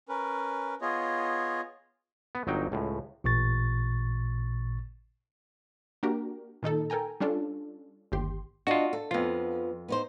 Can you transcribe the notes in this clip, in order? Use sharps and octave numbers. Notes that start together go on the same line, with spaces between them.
C#4 A#4 B4
B3 F4 G#4 C#5 D#5
B3
G1 F#3 D#4 G5
C#2 A2
A1 A#2 C#6 A6
A#3 D4 F#4 G4 A#4
A#2 D#3 D#4 A4
A4 A#4 G5 G#5 A#5
G3 C#4 D4 F4 A4
G1 D#2 G4 C6
D4 F4 F#4 D#5
A4
F2 F3 B3 F4
B3 D#4 C5